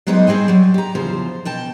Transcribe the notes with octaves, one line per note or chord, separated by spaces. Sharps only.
F#3 G#3 B3 D#4 C5 D5
G3 C4 G#4 C5 G5
F#3 G3
G4 A#5
E2 C#3 F3 C5
B2 G5 A5